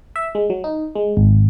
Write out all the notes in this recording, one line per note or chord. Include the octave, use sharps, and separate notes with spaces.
E5
G#3
F#3
D#4
G#3
G#1